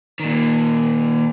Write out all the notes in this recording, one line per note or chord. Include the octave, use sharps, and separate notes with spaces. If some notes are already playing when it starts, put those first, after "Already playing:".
A#2 D#3